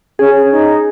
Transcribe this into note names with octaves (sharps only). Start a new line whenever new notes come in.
C#4 G#4
D#4